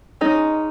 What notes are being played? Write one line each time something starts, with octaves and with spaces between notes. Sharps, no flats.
G#3 C#4 D#4